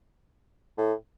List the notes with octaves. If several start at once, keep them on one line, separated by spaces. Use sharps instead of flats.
A2